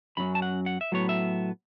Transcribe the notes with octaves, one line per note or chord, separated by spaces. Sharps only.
F#2 F#3 C#4 B5
A5
F#5
F#5
E5
A2 F#3 B3 C#5
E5